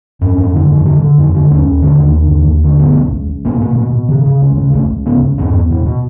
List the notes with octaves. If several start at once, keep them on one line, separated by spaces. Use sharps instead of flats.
F2 C#4
F2
D3
F2
D3
D3
F2
D3
D#2 C#4
D#2
D3
D#2
D3
D#2
D#2
D3
B2 B3
C#2
C#2
C#2
B2 A#3
B2
B2
B2
C#3
C#3
C#2
C#3
C#2 A3
C#2
C#3 B3
C#2
E2 C4
E2
B2
B2